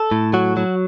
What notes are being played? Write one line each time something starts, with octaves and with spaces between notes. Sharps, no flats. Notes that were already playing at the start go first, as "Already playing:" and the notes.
Already playing: A4
A2
F#3 F#4
F#3